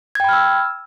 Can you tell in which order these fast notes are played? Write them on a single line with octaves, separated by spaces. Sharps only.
G#6 G5 B5 F6 E6